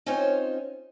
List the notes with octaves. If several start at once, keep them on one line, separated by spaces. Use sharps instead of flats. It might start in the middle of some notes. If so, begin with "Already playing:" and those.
C4 C#4 D#4 F4 C5 C#5